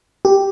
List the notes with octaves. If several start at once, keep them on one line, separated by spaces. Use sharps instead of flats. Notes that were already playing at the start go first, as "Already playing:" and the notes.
G4